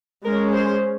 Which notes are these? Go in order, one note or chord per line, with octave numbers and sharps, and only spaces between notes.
G#3 C#4 A#4
C5